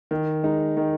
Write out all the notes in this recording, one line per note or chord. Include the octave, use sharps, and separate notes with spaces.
D#3
G#3 D#4
D#3